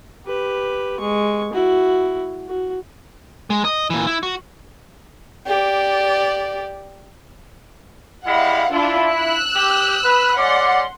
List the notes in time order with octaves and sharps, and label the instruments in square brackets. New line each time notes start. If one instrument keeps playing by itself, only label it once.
[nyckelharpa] G4 B4
G#3 C#6
E4 F#4
F#4
[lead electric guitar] G#3
D#5
A#2 E3
E4
F#4
[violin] G4 D5
[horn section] G3 G#3 E4 [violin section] F5 F#5
[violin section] D4 F4 [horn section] E4
[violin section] E6 F#6
[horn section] G4
B4
[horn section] G#3 C#4 D5 [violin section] F#5 C6